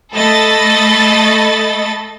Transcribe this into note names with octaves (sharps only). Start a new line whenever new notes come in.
A3 A4 D#5 B5 A6